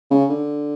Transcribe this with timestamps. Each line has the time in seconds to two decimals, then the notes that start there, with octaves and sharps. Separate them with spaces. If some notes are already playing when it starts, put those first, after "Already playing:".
0.11 C#3
0.30 D3